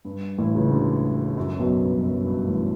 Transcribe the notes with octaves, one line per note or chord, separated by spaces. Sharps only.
G2
A1 A2
C#2 C#3
D2 D3
F#2 F#3
B1 B2
G2
F#2
G2
A1 A2